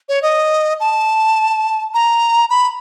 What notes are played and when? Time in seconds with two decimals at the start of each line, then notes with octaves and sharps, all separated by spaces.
0.09 C#5
0.22 D#5
0.80 A5
1.94 A#5
2.50 B5